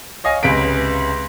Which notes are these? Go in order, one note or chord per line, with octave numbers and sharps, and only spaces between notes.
C#5 D#5 F5 G#5
C#2 C3 B4 B6 D7